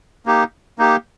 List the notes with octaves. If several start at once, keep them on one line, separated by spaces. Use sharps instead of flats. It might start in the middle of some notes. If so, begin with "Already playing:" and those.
A#3 D#4 G4
A#3 D#4 G4